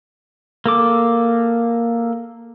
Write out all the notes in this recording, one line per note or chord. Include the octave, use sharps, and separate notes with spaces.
A#3 A4 D6